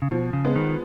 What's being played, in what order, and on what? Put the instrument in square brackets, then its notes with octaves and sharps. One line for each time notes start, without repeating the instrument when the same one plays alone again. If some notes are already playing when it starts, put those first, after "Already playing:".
[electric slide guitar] C#3
[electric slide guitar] B2 [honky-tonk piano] F3
[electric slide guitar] C#3
[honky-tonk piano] G#3 B3
[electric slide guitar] D#3